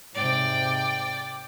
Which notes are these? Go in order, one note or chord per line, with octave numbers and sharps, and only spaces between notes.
G#2 C3 D5 G5